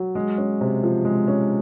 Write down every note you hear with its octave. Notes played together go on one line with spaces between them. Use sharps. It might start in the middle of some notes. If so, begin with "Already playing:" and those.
Already playing: F#3
G#3
C#4
C3
F3
G#3
C#4